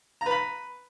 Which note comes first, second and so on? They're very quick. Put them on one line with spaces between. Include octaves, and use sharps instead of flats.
A#5 B4 B5